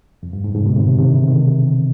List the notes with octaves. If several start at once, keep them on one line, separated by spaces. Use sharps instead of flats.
F2
G2
G#2
G#2 C3
B2 D3
G#2 C3
C3 D#3
C3 D#3
B2 D3
C3 D#3